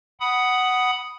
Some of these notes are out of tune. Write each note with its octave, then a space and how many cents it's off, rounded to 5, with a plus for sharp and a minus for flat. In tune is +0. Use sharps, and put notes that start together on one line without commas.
F#5 +10 B5 +0 D#6 +0